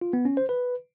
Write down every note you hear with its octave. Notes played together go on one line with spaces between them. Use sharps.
F4
B3
C#4
C5
B4